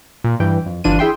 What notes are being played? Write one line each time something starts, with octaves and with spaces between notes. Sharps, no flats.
A#2
G2 E3 G5
F2
G1 E3 D4 F4 D#7
E4 G#4 E5 G5 C6